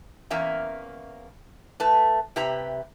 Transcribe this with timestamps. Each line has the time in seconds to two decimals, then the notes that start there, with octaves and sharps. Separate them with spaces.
0.30 E2 A#3 C#4 E5 A#5
1.80 A3 B4 A5
2.36 C3 G4 B4 E5 A#5